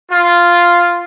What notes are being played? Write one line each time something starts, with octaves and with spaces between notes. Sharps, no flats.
F4